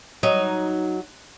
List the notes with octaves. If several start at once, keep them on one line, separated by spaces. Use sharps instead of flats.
F#3 D#4